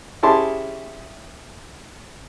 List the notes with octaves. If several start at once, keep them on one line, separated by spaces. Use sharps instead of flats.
C#4 E4 G4 G#4 A5 C6